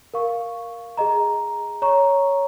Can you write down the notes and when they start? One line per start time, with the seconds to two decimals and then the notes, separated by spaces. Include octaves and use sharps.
0.14 A#4 F5 C#6
0.97 G#4 D#5 A#5
1.82 C#5 A#5 C#6